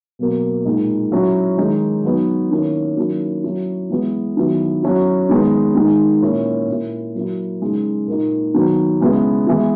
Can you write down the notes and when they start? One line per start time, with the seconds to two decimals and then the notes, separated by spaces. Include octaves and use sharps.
0.19 B2 F#3 A#3
0.65 A#2 G#3 D#4
1.12 F#3 C#4 E4
1.58 D#3 G#3 D#4
2.04 F#3 B3 D#4
2.51 D#3 A#3 C#4 E4
2.97 D#3 F#3 A#3 C#4 E4
3.44 F#3 C#4 E4
3.90 E3 G#3 B3 E4
4.37 D#3 F#3 B3 E4
4.83 F#3 C#4 E4
5.29 D#3 G#3 B3
5.75 D#3 G#3 D#4
6.22 A#2 A#3 C#4 E4
6.68 A#2 A#3 E4
7.15 F#3 A#3 E4
7.61 C#3 G#3 D#4
8.08 A#2 A#3 D#4
8.54 D#3 F#3 B3
9.00 C#3 G#3 B3 E4
9.47 E3 G#3 B3 E4